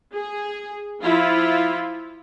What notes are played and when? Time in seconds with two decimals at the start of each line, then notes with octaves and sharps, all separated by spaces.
0.12 G#4
1.03 F3 E4 F4